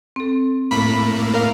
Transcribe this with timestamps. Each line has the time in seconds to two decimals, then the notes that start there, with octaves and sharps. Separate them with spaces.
0.16 C4 A4
0.71 A2 A3 A#3 B5
1.34 A#4 F5